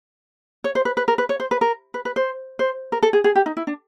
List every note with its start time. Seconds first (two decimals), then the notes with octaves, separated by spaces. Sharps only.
0.64 C#5
0.75 C5
0.85 B4
0.97 B4
1.08 A#4
1.18 B4
1.29 C#5
1.40 C5
1.51 B4
1.61 A#4
1.94 B4
2.05 B4
2.16 C5
2.59 C5
2.92 A#4
3.03 A4
3.13 G#4
3.24 G#4
3.35 G4
3.46 D#4
3.57 E4
3.67 D4